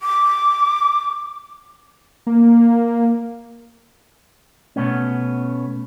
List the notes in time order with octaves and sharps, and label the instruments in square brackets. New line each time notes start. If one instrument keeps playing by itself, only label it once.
[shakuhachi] D6
[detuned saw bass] A#3
[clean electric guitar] B2 A3 B3 C#4